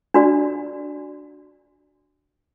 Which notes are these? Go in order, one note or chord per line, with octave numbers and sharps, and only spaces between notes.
D4 F#4 D5